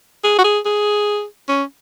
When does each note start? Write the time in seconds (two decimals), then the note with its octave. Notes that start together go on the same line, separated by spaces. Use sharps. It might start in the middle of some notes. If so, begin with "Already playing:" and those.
0.23 G#4
0.38 F#4
0.44 G#4
0.65 G#4
1.48 C#4